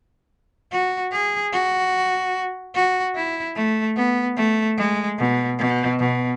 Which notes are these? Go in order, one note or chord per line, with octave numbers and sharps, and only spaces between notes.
F#4
G#4
F#4
F#4
E4
A3
B3
A3
G#3
B2
B2
B2